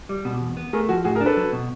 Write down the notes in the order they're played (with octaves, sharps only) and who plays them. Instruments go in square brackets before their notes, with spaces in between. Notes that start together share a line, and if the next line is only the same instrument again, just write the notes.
[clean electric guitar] G3
B2
E2
B3
[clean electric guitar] A3 [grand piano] G#4 A#4
[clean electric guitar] F3 [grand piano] F#4 G#4
[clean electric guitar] A2 [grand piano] F#4 G#4
[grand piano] G#4 A#4
[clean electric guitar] D4
[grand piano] A4 B4
[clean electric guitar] F#3
B2